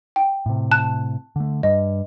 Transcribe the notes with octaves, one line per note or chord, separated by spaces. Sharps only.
G5
A2 C3
A5 F#6
D3 A3
G2 D#5